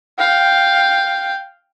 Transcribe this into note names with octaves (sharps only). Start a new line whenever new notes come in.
F5 G5